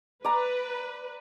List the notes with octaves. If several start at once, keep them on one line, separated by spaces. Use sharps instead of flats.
B4 D5 A#5